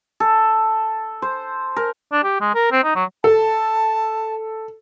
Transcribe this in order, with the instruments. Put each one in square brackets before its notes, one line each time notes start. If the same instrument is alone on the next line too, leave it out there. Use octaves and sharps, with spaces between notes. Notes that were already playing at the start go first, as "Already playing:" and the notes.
[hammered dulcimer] A4
C5
A#4
[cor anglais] D4
G4
G#3
A#4
C4
D#4
F#3
[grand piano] A4 [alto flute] A5